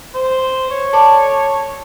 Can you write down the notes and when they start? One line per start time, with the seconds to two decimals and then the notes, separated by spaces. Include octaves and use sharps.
0.15 C5
0.70 C#5
0.93 A4 D5